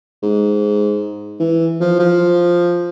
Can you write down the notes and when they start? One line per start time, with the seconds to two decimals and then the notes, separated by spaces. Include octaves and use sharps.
0.23 G#2
1.40 E3
1.80 F3
1.99 F3